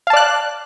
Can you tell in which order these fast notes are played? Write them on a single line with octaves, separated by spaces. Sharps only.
F5 A5 D5 F#6